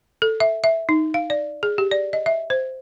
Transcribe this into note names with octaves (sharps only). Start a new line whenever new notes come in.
A4
E5
E5
D#4
F5
D5
G#4
G4
D5
D#5
E5
C5